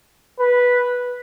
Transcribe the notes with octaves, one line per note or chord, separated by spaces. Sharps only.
B4